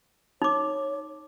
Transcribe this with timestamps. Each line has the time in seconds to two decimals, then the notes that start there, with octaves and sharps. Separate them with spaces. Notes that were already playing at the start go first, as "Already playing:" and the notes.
0.42 D#4 C#5 D6